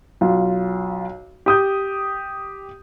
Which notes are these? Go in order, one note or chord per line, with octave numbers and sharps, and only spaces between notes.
B1 F4
G4 D#6 G6